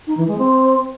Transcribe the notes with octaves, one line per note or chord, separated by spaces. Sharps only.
D#4
E3
G#3
C4